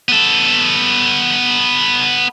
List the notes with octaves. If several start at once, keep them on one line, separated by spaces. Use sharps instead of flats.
B3 A4